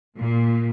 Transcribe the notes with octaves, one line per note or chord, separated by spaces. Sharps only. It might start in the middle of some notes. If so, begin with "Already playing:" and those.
A#2